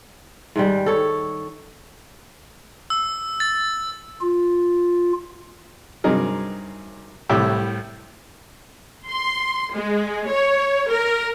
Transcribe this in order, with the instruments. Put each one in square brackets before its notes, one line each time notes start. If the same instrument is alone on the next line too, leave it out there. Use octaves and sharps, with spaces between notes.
[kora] G#2 D#3 G3
A4 C#5
[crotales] E6
A6
[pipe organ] F4
[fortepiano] G2 C3 F#3 D#4 G#4 A#4
C2 A2 G4 E5
[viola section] C6
G#3
C#5
A#4